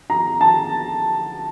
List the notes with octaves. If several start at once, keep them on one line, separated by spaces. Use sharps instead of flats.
A#5
A5